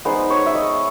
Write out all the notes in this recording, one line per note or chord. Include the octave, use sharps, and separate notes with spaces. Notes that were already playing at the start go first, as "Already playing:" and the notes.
G#3 B3 D#4 C5
C#5
E5
D#5